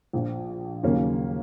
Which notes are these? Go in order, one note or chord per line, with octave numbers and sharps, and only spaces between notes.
A#1 A#2 F3
D#2 C#3 F#3 A#3 C#4